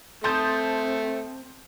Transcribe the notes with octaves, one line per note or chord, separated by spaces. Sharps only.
A3 C4 A5 C6 D#6 G6